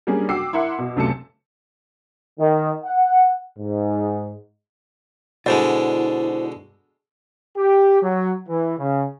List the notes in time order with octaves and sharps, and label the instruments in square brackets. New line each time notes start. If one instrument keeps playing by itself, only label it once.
[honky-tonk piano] G3 A#3 C#4 D4 G#4
F#4 G5 D6 E6 C7
E4 A#4 E5 F#5 C6
B2
C#2 F#2 C3 A3 A5 C#7
[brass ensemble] D#3
F#5
G#2
[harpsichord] B2 D3 G#3 [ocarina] E4 [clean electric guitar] C5 D5
[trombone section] G4
F#3
E3
C#3